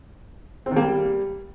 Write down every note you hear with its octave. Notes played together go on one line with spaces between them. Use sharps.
C4
D#3
A#3
G3